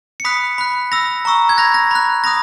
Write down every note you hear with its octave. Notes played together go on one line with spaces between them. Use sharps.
C#7
B5 D#6 F#6 B6
B5 F#6
B5 E6 A#6
A#5 C#6 E6
G#6
B5 F#6 A#6
A#6
B5 F#6
B5 D#6 F#6 A#6